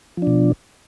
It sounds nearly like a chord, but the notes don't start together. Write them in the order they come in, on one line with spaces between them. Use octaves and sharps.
F3 D4 B2